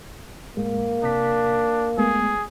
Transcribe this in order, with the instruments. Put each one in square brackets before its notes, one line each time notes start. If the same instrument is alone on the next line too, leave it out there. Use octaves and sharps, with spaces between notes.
[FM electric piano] A2 G#3 [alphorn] A#3
[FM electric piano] C3 B6 [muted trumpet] D4
[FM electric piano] G#3 A3 B3 [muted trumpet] G#4